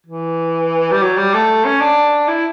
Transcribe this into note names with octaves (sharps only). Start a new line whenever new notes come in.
E3
G3
F#3
G3
A3
C#4
D4
E4